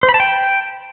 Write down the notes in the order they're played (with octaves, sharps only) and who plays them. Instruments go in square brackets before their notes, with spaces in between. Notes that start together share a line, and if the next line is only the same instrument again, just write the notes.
[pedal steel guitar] C5
B5
A5
G5